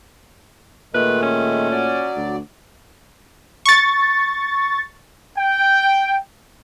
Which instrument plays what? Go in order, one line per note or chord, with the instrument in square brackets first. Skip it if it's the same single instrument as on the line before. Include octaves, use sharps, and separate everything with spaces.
[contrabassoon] A#2 [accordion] D#3 G#3 [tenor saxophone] A3 [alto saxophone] B4
[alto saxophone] C#4
[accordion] F#3 D5
[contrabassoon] D2
[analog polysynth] C#6 A6
[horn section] G5